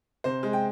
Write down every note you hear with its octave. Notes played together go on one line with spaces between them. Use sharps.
C3 C5
G#3
G5